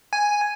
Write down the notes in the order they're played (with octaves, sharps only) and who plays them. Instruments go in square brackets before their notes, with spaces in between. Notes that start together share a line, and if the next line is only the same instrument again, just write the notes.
[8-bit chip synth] G#5